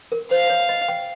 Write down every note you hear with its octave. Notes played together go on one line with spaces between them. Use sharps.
A#4
C5 F5
C#5
D#5
G5